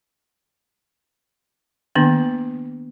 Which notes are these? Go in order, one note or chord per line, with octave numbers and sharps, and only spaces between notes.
D#3 A#3 B3 D4